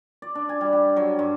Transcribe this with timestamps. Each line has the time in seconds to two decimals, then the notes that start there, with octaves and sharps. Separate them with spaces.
0.22 D5
0.35 D4
0.49 G#5
0.61 G3
0.73 G4
0.96 F#3
1.19 G2